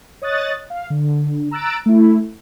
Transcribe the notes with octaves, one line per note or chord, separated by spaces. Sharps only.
C#5 D#5 D#6 F#6 A6
F5
D3
A#5 E6 F#6 A6 D7
A3 E4